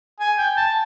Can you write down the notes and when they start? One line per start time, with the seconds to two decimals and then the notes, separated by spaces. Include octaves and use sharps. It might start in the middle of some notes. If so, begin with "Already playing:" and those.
0.20 G#5
0.38 G5
0.57 A5